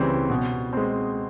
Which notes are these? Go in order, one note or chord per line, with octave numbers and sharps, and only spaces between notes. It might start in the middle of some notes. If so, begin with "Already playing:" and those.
Already playing: C#2 C#3 E3 G3 C4
B2
G#3 C4